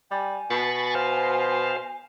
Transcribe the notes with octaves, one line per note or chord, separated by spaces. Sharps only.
G3 G#5
B2 B5 C#6 A6
C5 F5